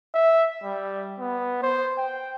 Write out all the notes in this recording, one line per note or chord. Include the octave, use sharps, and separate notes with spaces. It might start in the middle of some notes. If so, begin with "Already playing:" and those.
E5
G3
B3
C5
G5